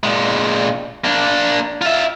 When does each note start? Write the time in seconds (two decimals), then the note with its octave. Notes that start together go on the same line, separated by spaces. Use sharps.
0.04 A#2 G#3
1.04 A#3 D4
1.82 F4 E5